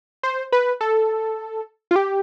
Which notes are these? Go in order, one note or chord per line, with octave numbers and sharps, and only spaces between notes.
C5
B4
A4
F4
G4